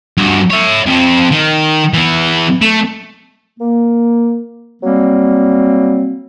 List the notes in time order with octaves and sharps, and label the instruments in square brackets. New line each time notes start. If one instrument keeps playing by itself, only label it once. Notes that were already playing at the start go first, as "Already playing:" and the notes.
[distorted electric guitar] G2 F#4
C#5 E5
F2 C4
D#3
E3 B3
A3
[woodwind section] A#3
F#3 G3 A#3 C4